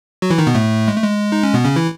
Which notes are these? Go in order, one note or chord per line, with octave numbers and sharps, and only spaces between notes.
F#3 F#4
E3 E4
D#3 D#4
B2 B3
A2 A3
G#3
A3
G#3
D#4
C#4
B2 B3
C#3 C#4
E3 E4